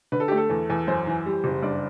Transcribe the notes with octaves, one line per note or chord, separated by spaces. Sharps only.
D3 B4
A4
G4
A3
A4
E2
E2
F#2 C5
E3
G3
F#1
G2 D5